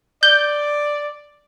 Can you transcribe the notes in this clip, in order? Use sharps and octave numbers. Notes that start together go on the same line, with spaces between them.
D5 G6